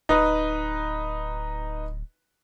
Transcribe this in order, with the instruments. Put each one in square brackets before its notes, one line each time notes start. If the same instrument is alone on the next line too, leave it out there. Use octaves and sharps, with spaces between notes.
[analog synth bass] D1 [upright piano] D#4 B4 D#6